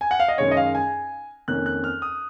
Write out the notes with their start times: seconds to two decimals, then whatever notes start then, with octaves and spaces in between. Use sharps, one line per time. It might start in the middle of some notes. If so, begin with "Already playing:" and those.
0.01 G#5
0.11 F#5
0.20 F5
0.28 D#5
0.38 F#2 D#3 G#3 C#4 C#5
0.51 D#5
0.57 F5
0.75 G#5
1.48 F2 D#3 A#3 C#4 F#6
1.66 F#6
1.84 F6
2.02 D#6